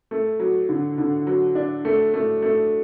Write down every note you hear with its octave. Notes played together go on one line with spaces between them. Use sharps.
A3
F#3
D3
D3
F#3
D4
A3
A3
A3